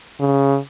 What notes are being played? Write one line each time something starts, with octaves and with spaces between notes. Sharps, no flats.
C#3